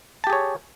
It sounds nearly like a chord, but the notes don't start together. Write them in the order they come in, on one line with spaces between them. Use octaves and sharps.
A5 G4 G#4 C#5